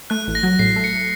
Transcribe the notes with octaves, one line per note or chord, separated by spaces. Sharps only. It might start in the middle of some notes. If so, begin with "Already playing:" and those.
A3 F#6
A1
A#6
F#3
A2 C7
A3
C#7